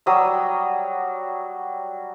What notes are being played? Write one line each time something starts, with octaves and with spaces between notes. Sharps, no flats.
F#3 G3 D#6 E6